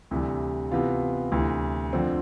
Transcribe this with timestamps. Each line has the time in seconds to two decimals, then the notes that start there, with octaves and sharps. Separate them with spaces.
0.11 D2 C3 E3 G3
0.71 C3 E3 B3 F4
1.32 D2 C3 E3
1.93 F2 D3 F3 C4